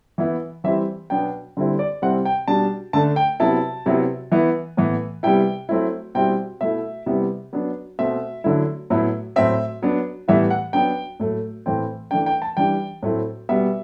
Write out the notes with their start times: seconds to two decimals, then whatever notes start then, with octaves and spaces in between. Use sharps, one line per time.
0.18 E3 B3 E4
0.64 E3 G3 C4 E4 E5
1.10 B2 F#3 B3 D4 G5
1.57 D3 G3 C4 E4
1.79 D5
2.02 C3 G3 C4 E4 F#5
2.25 G5
2.48 B2 G3 D4 A5
2.93 D3 A3 D4 A5
3.16 G5
3.40 C3 F#3 B3 E4 A5
3.86 C3 F#3 B3 E4
4.32 E3 B3 E4
4.77 A2 E3 B3
5.23 C3 G3 B3 E4 G5
5.69 F#3 A3 C4 E4
6.15 B2 G3 C4 E4 G5
6.61 B2 A3 E4 E5
7.06 C3 G3 B3 E4
7.53 F#3 B3 D4
7.99 B2 A3 C4 E5
8.44 D3 F#3 A3 E4
8.90 A2 F#3 B3 E4
9.36 A2 F#3 C4 E5
9.82 F#3 B3 D4
10.28 A2 E3 G3 B3 E4 E5
10.50 F#5
10.73 F#3 B3 D4 G5
11.20 A2 F#3 A3
11.66 A2 E3 A3 C4 G5
12.11 E3 A3 D4 G5
12.26 G5
12.42 A5
12.57 E3 G3 D4 G5
13.03 A2 F#3 A3 C4 E4
13.49 B2 G3 B3 E5